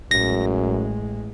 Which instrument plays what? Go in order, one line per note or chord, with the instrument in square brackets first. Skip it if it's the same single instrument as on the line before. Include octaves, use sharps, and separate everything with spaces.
[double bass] A1 G#3 [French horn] F#2 [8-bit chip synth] A#6